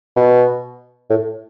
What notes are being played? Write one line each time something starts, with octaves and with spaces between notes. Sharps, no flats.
B2
A2